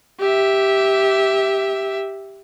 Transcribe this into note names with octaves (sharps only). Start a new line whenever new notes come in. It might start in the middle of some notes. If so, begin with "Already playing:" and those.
G4 E5